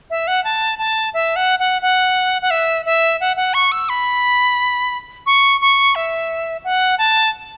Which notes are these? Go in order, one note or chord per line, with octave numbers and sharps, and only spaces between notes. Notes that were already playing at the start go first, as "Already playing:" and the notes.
E5
F#5
A5
A5
E5
F#5
F#5
F#5
F#5
E5
E5
F#5
F#5
C#6
E6
B5
C#6
C#6
E5
F#5
A5